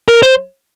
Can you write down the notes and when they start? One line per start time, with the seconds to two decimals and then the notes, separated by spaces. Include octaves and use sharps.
0.08 A#4
0.23 C5